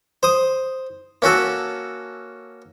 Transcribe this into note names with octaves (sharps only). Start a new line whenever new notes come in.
C5 D#6
A#3 C#4 F#4 A4